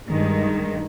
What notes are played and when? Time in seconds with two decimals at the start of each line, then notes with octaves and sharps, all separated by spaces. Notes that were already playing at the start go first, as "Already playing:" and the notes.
0.09 G2 D#3 G#3